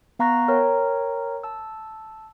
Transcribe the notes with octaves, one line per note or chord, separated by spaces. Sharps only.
B3 F5 A#5 C#6 F#6 A#6
A#4 C#5 G5 A#5
A5 E6